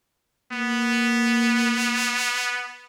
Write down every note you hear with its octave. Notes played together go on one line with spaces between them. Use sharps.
A#3 B3